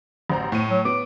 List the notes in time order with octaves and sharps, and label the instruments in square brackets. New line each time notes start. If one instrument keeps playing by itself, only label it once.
[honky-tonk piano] A1 C5 A#5
A2 D#7
[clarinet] F#3
[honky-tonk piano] B3 [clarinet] D6